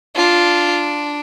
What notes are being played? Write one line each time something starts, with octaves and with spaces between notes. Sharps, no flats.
D4 F4